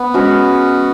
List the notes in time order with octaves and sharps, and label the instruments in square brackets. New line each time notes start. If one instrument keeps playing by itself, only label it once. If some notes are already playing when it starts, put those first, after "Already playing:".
Already playing: [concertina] B3
[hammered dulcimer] G#3 C#4 F#4